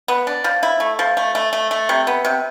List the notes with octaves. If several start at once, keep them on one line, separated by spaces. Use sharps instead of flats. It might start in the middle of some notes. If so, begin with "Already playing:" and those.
B3
D4
F3
E4
A3
F3
A3
A3
A3
A3
C3
B3
C3